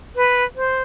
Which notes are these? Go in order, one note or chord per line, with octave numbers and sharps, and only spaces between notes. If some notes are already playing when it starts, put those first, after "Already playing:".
B4
C5